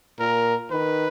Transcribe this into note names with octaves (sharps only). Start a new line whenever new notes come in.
A#2 A#4
D#3 B4